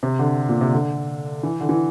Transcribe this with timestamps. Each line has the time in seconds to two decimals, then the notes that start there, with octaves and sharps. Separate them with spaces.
0.03 C3
0.19 D3
0.49 A#2
0.61 C3
0.73 D3
1.43 E3
1.61 D3
1.69 E3